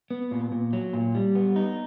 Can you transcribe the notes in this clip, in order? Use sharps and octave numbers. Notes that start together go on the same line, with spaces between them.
B3
A#2
A#2
F#3
A#2
G3
B3
D#4